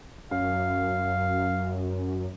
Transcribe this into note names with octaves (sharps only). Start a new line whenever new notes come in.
F#2 F5